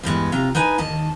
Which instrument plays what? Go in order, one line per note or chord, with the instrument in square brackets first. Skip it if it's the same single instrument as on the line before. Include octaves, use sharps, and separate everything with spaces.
[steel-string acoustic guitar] E2 G2 G#3 B3
C3 F4 A#5
D#4 B4 D#5 G#5
D#2 D#3 D#5 A5